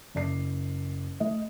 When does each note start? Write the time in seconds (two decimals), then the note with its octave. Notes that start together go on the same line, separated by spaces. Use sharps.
0.15 F#1 D5 C7
1.20 A3 D#5